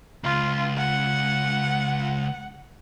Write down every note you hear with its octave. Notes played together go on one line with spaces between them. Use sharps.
C#2 F4
F#5